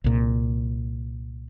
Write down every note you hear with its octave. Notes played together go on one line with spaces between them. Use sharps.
C2 A#2